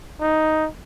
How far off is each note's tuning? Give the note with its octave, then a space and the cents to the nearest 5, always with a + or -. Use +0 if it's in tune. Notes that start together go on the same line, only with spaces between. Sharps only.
D#4 +5